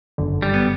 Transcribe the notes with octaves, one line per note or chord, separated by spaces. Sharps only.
G1 F#2 D3
G3
B3